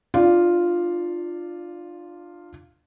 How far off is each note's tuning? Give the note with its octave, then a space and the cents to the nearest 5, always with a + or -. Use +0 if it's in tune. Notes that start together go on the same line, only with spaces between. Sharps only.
D4 +35 F4 +0 D5 +0